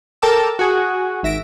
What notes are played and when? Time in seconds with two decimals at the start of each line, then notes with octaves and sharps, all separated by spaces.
0.22 A4 A#4 G5 A5 D6 E6
0.59 F#4 G#4
1.23 G#1 E5 A#6 D7